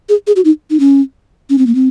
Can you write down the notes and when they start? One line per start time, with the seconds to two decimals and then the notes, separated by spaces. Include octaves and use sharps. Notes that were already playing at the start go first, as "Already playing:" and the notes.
0.09 G#4
0.27 G#4
0.36 F#4
0.45 D#4
0.70 D#4
0.80 C#4
1.50 C#4
1.58 C4
1.66 A#3
1.75 C4